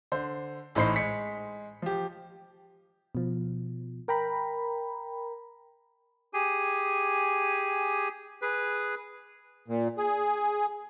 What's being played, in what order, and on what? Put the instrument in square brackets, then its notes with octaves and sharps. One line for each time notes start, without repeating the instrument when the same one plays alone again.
[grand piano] D3 C5
A1 A2 D#4 C5 B5 C7
G#3 B6 C#7
F3 G4
[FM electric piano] B2 F3
A#4 G5 A#5 B5
[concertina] G4 G#4 G#5
G#4 B4
[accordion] A#2
G#4